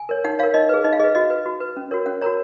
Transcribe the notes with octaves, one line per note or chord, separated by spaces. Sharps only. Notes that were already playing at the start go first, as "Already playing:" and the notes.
Already playing: G#5
A#4 C#5
D#4 F#5
A#4 C#5 F5
D#4 D#5
G#4 B4
D#4 D#5
F5
G#4 B4 D#5
F#4 D#5
B4
F#4
B4
C#4
F#4 A#4 C#5
C#4 F#5
F#4 A#4 C#5 A#5